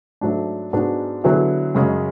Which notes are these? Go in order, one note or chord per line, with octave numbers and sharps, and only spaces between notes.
G#2 F#3 A3 D4
G#2 G#3 B3 D4 F#4
D3 F#3 B3 E4 G#4
F#2 C#3 G#3